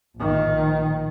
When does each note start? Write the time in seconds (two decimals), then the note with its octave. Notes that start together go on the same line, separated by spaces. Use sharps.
0.16 A#1 D#3